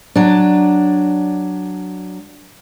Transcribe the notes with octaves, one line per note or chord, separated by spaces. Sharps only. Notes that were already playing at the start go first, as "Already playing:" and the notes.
F#3 D4